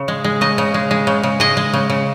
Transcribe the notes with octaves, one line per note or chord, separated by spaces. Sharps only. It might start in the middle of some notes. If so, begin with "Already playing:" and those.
Already playing: C#3
G#3
G#3
C#3 D#5
C#3
G#3
G#3
C#3
C#3
G#3 D#5
G#3
C#3
C#3